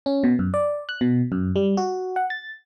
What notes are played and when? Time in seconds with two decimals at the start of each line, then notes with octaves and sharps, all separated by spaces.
0.06 C#4
0.24 B2
0.39 F#2
0.54 D5
0.89 F#6
1.01 B2
1.32 F#2
1.56 G3
1.77 F#4
2.16 F#5
2.30 A6